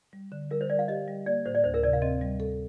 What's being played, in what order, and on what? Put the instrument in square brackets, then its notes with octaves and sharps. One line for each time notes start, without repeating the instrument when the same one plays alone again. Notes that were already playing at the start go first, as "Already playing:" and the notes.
[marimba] G3
D3
[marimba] G3 [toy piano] A#4
[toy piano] C5
[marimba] G3 [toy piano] D5
[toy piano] F5
[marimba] G4 [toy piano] D#5
[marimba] G3
[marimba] A#3 [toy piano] D5
[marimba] A2 [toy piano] C5
[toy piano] D5
[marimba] D2 [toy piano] C5
[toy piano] A#4
[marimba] C3 [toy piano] D5
[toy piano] F5
[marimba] C4 [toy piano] D#5
[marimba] G3
A4